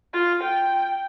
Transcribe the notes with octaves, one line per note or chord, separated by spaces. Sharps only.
F4
G5